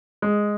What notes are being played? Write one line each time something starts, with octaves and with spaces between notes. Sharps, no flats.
G#3